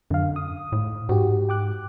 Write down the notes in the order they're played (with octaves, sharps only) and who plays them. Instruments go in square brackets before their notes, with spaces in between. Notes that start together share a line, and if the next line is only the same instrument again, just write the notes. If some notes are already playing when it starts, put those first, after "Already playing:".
[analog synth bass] F#2 [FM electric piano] D3 F5
[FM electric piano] D#6
[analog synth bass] A2
[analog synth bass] G#2 [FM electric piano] F#4 G4
[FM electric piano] G5 D6 F#6